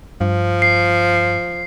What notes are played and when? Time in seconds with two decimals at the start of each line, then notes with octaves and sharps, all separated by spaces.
0.21 G2 F3
0.62 C7